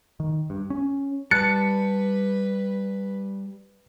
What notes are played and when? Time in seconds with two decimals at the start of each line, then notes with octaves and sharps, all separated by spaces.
0.20 D#3
0.50 G2
0.70 C#4
1.31 G3 B4 A5 F#6 A6 C#7